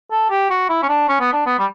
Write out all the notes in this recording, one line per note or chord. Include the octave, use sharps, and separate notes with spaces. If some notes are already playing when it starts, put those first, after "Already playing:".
A4
G4
F#4
E4
C#4
D4
C#4
B3
D4
B3
G3